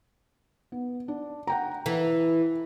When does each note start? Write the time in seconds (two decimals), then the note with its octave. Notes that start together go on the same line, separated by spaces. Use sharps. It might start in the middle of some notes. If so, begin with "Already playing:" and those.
0.72 B3
1.08 D4
1.47 F#5 G5 A#5
1.86 E3 A4